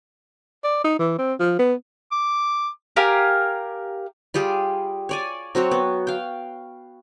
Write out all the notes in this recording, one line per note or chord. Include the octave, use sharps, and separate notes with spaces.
D5
D#4
E3
C4
F3
B3
D6
G4 A#4 F5 G#5
G3 F4 G4 G#4
C#5 D5 G#5
F#3 C4 F#4 C#5
B3
F5 G5